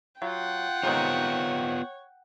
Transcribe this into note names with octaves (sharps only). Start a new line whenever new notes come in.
F#3 F4 F#5 G5
G#2 C3 D#3 B3 F4 C#5